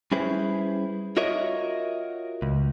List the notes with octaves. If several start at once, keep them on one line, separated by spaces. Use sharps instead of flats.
G3 C#4 E4 G#4 B4 C5
F4 F#4 A#4 C#5 D#5 E5
C#2